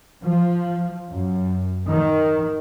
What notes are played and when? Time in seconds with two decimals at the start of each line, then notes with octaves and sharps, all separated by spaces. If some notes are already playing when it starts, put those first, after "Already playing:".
0.24 F3
1.11 F#2
1.85 D#3